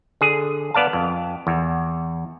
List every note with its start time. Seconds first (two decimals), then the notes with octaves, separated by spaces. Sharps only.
0.21 D3 G#4
0.74 B3 D5 F5 A5
0.93 F2
1.47 E2